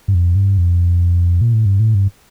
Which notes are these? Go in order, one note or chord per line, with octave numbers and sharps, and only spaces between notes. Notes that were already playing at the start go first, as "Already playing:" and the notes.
G2
F2
G2
F2
A#2
A2
G2
A2
G2